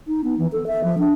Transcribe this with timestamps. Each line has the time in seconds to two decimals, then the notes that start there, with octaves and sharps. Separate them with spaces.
0.08 D#4
0.24 B3
0.38 E3
0.52 A4
0.67 E5
0.84 F3
0.98 D4